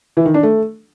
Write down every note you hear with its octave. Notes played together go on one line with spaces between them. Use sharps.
E3
D#3
D4
A3